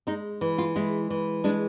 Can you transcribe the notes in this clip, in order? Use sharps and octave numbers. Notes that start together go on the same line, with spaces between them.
G#3 D#4
E3
F4
G#3 E4
E3
G#3 D4